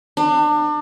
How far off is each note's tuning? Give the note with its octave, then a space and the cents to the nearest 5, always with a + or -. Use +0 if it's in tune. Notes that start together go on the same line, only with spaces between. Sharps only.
D4 +35